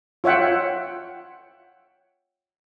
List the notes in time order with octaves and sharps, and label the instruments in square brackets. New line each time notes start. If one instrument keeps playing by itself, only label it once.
[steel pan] F4 C#5 E5 F#5 G5